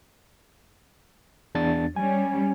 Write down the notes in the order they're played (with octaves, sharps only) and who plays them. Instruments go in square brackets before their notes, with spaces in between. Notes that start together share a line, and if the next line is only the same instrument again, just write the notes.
[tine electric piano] E2 D4 A6
[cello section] G3 C#4 [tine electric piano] G#5